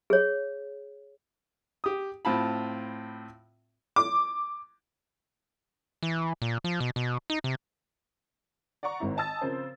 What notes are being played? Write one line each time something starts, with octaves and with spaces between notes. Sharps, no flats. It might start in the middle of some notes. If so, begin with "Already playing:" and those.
G#4 C#5
G4 D#6
A2 C4 F4 A5 B5
D6
E3
A#2
F3
B2
B2
D#4
C3
D5 F#5 A#5 C#6
G#1 G#2 D#3 C4 E4
D#5 G#5 A5 D#6 E6 A6
C#3 F3 C4 C#4 A#4 C5